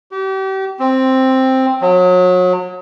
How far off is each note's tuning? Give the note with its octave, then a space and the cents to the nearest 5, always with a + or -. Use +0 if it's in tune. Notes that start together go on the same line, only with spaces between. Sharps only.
G4 -35
C4 +5
F#3 -30